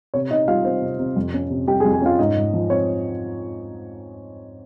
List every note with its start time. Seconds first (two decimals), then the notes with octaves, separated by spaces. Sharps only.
0.14 C3 C#5
0.31 C3 D#4 D#5
0.48 G3 F4 F5
0.65 C4
0.82 C3
0.99 C3
1.16 F2
1.34 C#4
1.50 C3
1.68 G3 G4 G5
1.80 G#4 G#5
1.85 F2
1.93 G#4 G#5
2.02 C#4 F4 F5
2.19 G#2 D#4 D#5
2.36 G#2
2.53 F3
2.70 C4 C#5